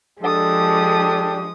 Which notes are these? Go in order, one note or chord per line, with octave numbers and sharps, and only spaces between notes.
F3 G#3 D4 G4 A4 D#6